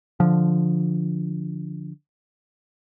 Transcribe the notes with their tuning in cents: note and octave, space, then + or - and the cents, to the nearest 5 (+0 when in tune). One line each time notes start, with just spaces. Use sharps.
D3 +0 F3 +0